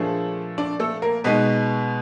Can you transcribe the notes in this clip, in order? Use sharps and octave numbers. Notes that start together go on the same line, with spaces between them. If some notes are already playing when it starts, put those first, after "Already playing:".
Already playing: A#2 F3 A3 D4 G#4
D4 D5
A3 A4
A#3 A#4
B2 G#3 B3 D#4 B4